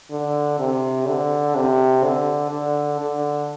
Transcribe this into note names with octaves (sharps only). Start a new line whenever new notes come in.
D3
C3
D3
C3
D3
D3
D3